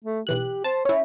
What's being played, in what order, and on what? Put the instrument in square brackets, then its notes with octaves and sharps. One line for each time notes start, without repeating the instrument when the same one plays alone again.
[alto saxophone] A3
[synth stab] B1 E3 F#6 [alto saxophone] G4
[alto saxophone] C5 [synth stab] A5
[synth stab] C#4 E4 [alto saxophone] C#5